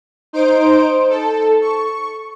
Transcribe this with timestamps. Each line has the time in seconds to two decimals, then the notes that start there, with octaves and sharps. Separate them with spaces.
0.33 D#4 C5 D7
1.09 A4
1.62 C#6